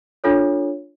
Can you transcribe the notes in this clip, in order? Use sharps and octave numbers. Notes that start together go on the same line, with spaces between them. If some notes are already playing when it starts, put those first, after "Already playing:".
D4 F4 A4 C#5